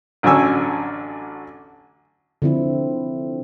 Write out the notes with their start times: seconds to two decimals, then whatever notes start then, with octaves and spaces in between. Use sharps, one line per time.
0.23 A1 D3 F#3 C#4 G#5 E6
2.42 D3 F3 C4 E4